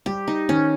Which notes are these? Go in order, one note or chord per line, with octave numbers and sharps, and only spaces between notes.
G3 G4
D#4
D#3 C#4